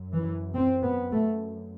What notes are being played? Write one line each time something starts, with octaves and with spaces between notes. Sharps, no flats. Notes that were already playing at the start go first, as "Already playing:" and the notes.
Already playing: F#2
E3
C4
B3
A3